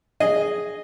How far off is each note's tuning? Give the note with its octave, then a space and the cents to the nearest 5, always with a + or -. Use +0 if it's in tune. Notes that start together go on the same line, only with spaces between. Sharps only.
G#4 +0 D#5 -10